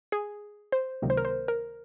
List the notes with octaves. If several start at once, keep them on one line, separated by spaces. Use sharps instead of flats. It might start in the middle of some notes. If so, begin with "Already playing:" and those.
G#4
C5
C#2 C3 D#3 F#3 A#3
C5
A#4
C5
A#4